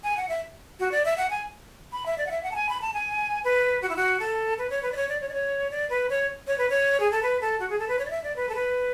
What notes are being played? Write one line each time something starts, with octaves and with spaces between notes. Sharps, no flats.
G#5
F#5
E5
F#4
D5
E5
F#5
G#5
B5
E5
D5
F#5
E5
F#5
A5
G#5
B5
A5
G#5
B4
F#4
E4
F#4
A4
B4
C#5
B4
D5
C#5
D5
C#5
D5
C#5
D5
B4
C#5
C#5
B4
C#5
G#4
A4
B4
A4
F#4
G#4
A4
B4
C#5
D5
E5
D5
B4
A4
B4